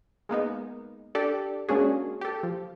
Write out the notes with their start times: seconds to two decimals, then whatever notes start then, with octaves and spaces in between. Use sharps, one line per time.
0.29 G#3 A#3 B3 D#4
1.15 D4 G4 A4 D5
1.69 G#3 A#3 C#4 D4 F#4 G#4
2.21 G4 A4
2.43 F3